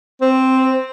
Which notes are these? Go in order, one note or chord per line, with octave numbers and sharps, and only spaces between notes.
C4